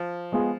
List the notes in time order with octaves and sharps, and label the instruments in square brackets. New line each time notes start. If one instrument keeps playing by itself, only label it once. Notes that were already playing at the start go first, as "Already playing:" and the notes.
Already playing: [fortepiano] F3
[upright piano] G#3 B3 F4 G#4